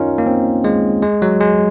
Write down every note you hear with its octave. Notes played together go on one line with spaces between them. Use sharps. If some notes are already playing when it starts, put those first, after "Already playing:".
Already playing: C#4 D#4 F4 A#4
A#3
C4
G#3
G#3
F#3
G#3